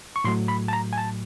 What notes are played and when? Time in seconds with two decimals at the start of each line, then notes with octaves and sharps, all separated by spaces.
0.16 C#6
0.24 A2 F#3 A3 C6
0.48 B5
0.68 A5
0.73 A#5
0.93 G#5
0.98 A5